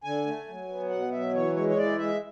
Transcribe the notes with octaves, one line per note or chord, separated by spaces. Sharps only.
D3 G#5
A3
F#3
B3
B2 F#5
F#3 E5
E3 C#5
G#3 C#5
C#5
E3 D5
G#3 E5